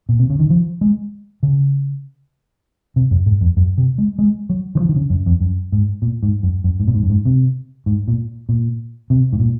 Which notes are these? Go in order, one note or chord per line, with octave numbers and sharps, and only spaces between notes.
A#2
C3
C#3
D#3
F3
G#3
C#3
C3
F#2
G#2
F2
F#2
C3
G#3
G#3
F#3
D#3
F3
D#3
C#3
F#2
F2
F#2
G#2
A#2
G#2
F#2
F#2
G#2
A#2
G#2
F#2
G#2
C3
G#2
A#2
A#2
C3
G#2
A#2